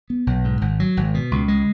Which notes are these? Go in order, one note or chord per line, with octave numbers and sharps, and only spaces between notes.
B3
B1
G#2
G#1
F#3
G#1
B2
C#2
G#3